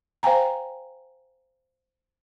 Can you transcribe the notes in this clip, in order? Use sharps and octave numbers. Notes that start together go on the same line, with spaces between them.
C5 F5 G5 G#5 A#5